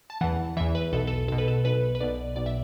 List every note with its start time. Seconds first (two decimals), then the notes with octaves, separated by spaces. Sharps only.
0.10 A5
0.21 E2 E3 F#5
0.57 E3 E5
0.61 E2
0.75 B4
0.92 B1 B2 A4
1.07 A4
1.28 B1 B2 A4
1.38 B4
1.48 A4
1.65 B1 B2 B4
1.95 B4
2.00 B1 B2 D5
2.36 B1 B2 D5
2.46 E5